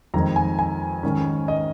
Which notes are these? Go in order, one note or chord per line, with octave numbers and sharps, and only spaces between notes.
F2 D#3 G#3 A#5
G#5
G#5
G#2 D#3 C#4
D#5